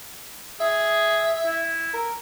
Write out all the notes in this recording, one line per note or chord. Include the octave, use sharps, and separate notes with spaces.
G#4 E5
E4
A#4